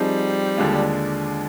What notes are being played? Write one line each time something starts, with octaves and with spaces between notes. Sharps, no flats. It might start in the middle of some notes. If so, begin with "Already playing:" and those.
Already playing: F3 G3 C4 D#4 G#4
D#2 D3 G#3 D4 F4